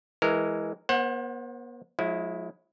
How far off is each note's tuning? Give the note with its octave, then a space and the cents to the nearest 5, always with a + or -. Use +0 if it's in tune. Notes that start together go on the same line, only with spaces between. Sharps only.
E3 +0 G#3 +0 A#4 -15
B3 -40 C5 +35 F#5 +0
F3 +45 G#3 +25 E4 +0